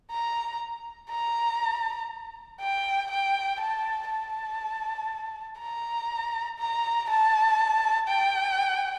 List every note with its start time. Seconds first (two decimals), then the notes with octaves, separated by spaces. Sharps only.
0.11 A#5
1.10 A#5
2.60 G5
3.11 G5
3.60 A5
4.10 A5
5.59 A#5
6.59 A#5
7.09 A5
8.08 G5